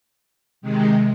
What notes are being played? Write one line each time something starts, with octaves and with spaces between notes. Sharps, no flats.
C3 D#3 G#3